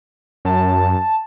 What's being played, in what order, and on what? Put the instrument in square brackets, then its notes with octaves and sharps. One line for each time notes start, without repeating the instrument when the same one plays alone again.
[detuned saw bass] F#2 [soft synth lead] A5